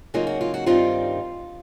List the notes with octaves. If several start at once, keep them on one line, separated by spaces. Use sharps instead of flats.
C#3 F#3 A#3 D#4 F4
F#4
F4
F#4
G2 D#3 G3 C4 D#4 F4